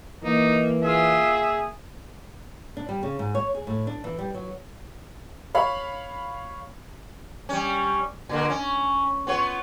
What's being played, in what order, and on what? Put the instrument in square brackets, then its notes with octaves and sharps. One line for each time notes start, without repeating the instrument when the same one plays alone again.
[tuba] E3 [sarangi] A#3 [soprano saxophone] D#4
[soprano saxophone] F4 [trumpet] G#4 [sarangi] E5
[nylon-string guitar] D4
G3
C#3
G#2
C#5
G#4
A2
D4
E3
G3
F#3
[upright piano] C#5 F5 B5
[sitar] G3 C#4
A#2 D3 A#3
C#4
B3 F4 C#5